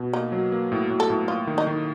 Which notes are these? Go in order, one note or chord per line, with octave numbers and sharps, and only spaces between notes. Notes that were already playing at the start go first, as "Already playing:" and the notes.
Already playing: B2
A#3 D#4
F#3
A#3
A2
A2
A4
A2
A#3 F4
D#3
D#4
D#3